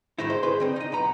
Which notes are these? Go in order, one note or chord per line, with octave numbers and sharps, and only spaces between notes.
G#2 D#3 G#3 D#4 E4
C5
G#4 B4 C5 C6
D3 C4 D#4
D#4 D#5
B1 B3 A#5